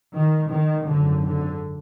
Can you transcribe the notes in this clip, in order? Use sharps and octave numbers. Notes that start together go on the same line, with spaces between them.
D#3
D#3
G#1 F#2 D3
D3